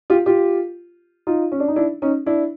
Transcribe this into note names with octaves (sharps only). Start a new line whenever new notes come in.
F4 G4
F4 G4
D#4 F4
C#4
D4
D#4
D4 E4
C#4 D#4
D4 E4